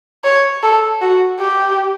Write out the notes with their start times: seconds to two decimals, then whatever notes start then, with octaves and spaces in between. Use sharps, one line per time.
0.24 C#5
0.63 A4
1.01 F#4
1.40 G4